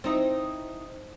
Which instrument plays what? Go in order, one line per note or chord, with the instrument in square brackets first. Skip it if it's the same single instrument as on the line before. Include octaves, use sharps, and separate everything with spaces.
[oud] C4 D#4 E4